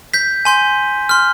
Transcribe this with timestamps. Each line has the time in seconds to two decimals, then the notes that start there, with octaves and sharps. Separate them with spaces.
0.14 G6 B6
0.45 G#5 C6 G6
1.09 C6 F6